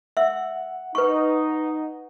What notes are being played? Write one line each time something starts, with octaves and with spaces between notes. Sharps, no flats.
E5 F#5 E6
D#4 B4 C#6